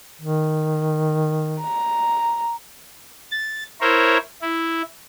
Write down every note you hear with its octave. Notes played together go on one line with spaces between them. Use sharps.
D#3
A#5
A6
E4 A#4 C5 C#5
E4